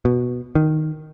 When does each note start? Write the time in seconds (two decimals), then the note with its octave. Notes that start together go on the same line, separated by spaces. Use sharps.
0.05 B2
0.55 D#3